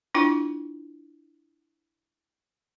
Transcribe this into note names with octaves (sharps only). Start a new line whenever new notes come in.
D4 E4 F4 G5